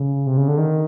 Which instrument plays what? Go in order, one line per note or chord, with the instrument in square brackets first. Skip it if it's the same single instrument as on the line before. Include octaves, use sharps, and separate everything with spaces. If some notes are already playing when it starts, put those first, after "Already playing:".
Already playing: [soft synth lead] C#3
C3
C#3
D3
D#3